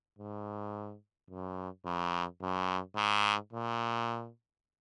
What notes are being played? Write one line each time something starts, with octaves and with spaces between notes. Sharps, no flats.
G#2
F#2
F2
F#2
G#2
A#2